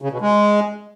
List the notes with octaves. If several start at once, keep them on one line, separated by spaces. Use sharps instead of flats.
C#3
B2
G#3